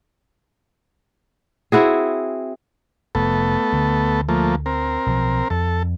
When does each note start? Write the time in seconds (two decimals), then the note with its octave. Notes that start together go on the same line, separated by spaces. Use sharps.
1.72 C4 E4 F#4 G#4
3.15 F1 A3 B3 A4
3.72 D2 D3
4.29 F3 A3 A#3
4.66 C4 A#4
5.06 B1 F3
5.50 F2 A4